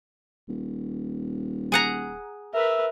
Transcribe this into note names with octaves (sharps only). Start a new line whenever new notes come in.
D#1
G#4 F#5 A#5
A#4 B4 E5